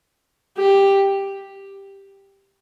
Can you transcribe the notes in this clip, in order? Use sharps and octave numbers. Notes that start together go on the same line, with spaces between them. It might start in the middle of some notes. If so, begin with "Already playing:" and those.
G4